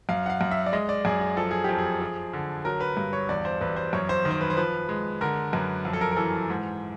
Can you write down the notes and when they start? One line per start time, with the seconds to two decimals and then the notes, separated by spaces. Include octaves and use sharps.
0.09 F#2 F5
0.26 F#5
0.30 F5
0.41 F#2
0.51 E5
0.66 D5
0.73 G#3 D#5
0.89 D5
1.05 F#2 G#4
1.21 G#4
1.37 F3 A4
1.51 G#4
1.64 F2 G4
1.78 G#4
2.01 F3
2.33 D3
2.65 F#3 A#4
2.81 B4
2.97 G2
3.13 C#5
3.29 E2 D5
3.45 C5
3.61 E2 B4
3.76 C5
3.93 F#2 C#5
4.09 C5
4.25 D#3
4.31 C5
4.41 B4
4.50 C5
4.57 F3 B4
4.89 G#3
5.21 D3 A#4
5.53 F#2 B4
5.85 F2
5.93 A4
6.01 A#4
6.11 A#4
6.17 E3 A4
6.49 G#2